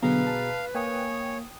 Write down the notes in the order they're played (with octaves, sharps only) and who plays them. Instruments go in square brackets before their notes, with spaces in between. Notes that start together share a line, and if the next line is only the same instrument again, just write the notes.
[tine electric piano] B2 G#4 A#5 [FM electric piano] D3 F#3 B3 [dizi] B4 [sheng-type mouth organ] F5
[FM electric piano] A5
[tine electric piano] A#3 [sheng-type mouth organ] C#5 [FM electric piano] G5 G#5 D#6